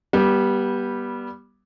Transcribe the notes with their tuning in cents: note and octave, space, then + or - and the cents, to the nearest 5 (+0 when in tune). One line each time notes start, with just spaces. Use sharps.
G3 +0 B3 -25